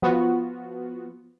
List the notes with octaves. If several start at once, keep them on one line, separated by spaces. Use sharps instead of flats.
F3 B3 F4 F#4